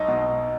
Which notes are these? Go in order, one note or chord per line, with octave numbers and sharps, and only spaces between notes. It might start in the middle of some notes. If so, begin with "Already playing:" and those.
Already playing: B1 D#4
B2